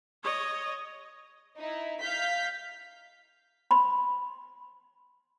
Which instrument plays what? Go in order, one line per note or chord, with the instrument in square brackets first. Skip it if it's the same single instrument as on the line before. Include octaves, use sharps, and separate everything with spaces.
[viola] C#5 D#5
[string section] D#4 E4
F5 G6 B6
[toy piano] B5 C6